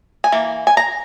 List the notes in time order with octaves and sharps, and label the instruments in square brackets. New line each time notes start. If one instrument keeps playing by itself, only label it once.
[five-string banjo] G#5
E3 A#3
G#5
A#5